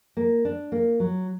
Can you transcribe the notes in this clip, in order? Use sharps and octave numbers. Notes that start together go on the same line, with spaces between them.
A#3
D4
A#3
F#3